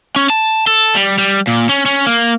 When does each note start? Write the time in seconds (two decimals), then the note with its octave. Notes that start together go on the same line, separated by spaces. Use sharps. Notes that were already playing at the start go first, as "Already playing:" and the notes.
0.16 C#4
0.30 A5
0.67 A4
0.95 G3
1.18 G3
1.47 A#2
1.69 C#4
1.86 C#4
2.06 A#3